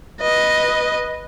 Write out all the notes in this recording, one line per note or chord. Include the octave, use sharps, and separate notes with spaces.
B4 D#5